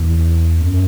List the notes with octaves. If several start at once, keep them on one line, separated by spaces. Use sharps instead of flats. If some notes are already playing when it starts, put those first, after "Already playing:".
Already playing: E2
F#2